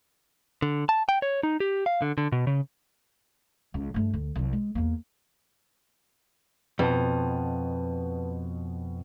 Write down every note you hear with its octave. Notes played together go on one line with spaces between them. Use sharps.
D3
A5
G5
C#5
D#4
G4
F5
D3
D3
B2
C#3
C#2
G2 A3
D2
C2 F#3
G#3
E2 A#3
F2 B2 B4 A5